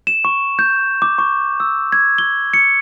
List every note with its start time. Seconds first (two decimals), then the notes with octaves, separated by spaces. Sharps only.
0.07 E7
0.25 C#6
0.59 G6
1.02 D6
1.18 C#6
1.60 E6
1.92 G#6
2.18 G7
2.54 C#7